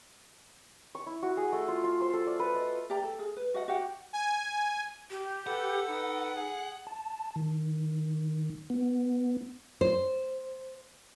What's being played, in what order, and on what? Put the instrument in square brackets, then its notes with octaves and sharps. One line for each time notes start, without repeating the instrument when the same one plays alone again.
[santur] C#6
E4
F#4
G#4
A3
F4
F4
C5
A4
D5
B4
D#5
[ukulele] G4 D5 G5 A#5
A4
G#4
B4
F#4 D#5 F#5
F#4 G4 F#5 G5
[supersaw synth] G#5
[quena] G4
[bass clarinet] A4 [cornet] B4 [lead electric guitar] F#5
[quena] D#4 [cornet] B4
[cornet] G#4
[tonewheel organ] A5
D#3
B3
[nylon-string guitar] C5